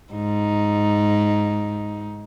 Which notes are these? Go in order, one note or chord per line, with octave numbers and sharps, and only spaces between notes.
G#2 D#4